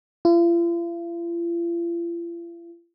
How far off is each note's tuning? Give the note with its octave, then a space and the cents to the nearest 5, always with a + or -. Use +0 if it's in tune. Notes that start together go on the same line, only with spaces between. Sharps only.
F4 -45